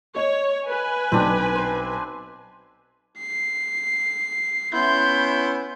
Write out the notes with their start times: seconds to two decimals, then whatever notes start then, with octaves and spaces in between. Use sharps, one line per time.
0.16 C#5 D#5
0.66 B4 G#5
1.12 B1 C4 D4
1.55 C5
3.19 C7
4.73 B3 C#4 E4 C6 G6